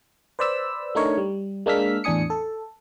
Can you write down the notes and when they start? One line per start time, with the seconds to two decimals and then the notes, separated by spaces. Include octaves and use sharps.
0.39 B4 C5 D5 B5 E6
0.95 A3 D4 D#4 A#4 C#5
1.17 G3
1.66 G#3 A#3 D4 E6 F6 B6
2.04 E2 A2 D4 G#5 D#6 C#7
2.30 A4